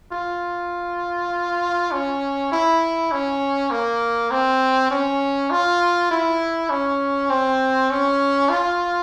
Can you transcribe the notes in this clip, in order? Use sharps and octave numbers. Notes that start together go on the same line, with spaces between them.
F4
C#4
E4
C#4
A#3
C4
C#4
F4
E4
C#4
C4
C#4
F4